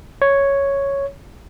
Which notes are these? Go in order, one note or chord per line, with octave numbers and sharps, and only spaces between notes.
C#5